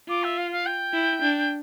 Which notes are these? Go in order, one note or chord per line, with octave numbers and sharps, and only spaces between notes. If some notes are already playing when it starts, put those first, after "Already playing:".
F4 D6
E5
F5
F5
G5
E4
D4